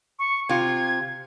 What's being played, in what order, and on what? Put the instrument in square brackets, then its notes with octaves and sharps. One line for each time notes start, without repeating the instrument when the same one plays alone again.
[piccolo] C#6
[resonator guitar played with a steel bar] C3 F4 [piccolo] G#6